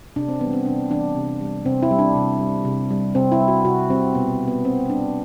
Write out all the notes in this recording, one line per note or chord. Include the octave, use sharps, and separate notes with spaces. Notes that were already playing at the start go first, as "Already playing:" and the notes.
C3 D4
C4
E3 G3 B3
C4
C3 D4
E3 G3 D4
C3
G3
C3 C4
E4
G3
D4
C3
G3
C3
G3
C3 C4
E4
G3
F#4
C3 F#4
G3 C4
B2 B3
G3
B3
B2 C4
G3 D4